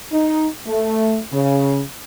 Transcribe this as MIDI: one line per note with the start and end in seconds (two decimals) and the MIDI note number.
0.12 0.47 63
0.66 1.19 57
1.32 1.79 49